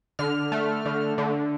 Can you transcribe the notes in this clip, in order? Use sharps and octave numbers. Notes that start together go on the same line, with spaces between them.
D3 F6
A3
D3
D3